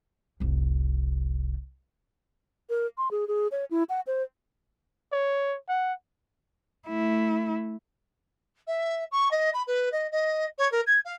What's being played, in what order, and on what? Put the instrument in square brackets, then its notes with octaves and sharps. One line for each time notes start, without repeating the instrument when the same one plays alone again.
[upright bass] F1 C2
[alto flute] A#4
C6
G#4
G#4
C#5
E4
F#5
C5
[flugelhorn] C#5
F#5
[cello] A3 E4
[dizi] E5
C#6
D#5
B5
B4
D#5
D#5
C#5
A#4
G#6
F5